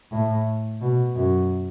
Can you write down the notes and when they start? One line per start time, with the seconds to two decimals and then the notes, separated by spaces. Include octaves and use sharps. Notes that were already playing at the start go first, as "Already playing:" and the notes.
0.11 A2
0.81 B2
1.16 F#2